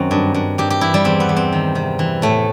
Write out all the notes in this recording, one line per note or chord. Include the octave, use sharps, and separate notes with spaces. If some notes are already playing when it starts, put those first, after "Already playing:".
Already playing: F#2 D#3 C4
G2
G2
G2 G4
G4
E3 E4
G3
E2 C4
B3
E2
C4
D#3
C3
E3
A2 A3